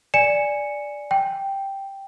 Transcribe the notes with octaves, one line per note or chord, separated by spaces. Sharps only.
D5 G#5 C#7 E7
G5